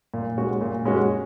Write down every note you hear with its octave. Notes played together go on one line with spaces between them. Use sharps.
A#2
G#3 C#4 F#4
A#2
G#3 C#4 F#4